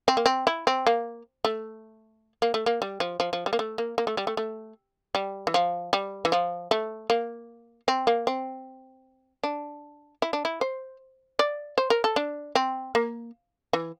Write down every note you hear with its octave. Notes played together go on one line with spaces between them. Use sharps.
C4
A#3
C4
E4
C4
A#3
A3
A#3
A3
A#3
G3
F3
F3
F3
G3
A#3
A3
A#3
A#3
A3
G3
A3
A3
G3
E3
F3
G3
E3
F3
A3
A#3
C4
A#3
C4
D4
E4
D4
E4
C5
D5
C5
A#4
A4
D4
C4
A#3
E3